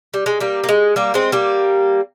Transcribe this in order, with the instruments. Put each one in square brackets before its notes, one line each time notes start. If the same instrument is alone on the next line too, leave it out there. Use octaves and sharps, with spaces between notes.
[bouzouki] G3
G#3
G3 A#3
A#3
G#3
G3 A#3
G#3 C4
G3 A#3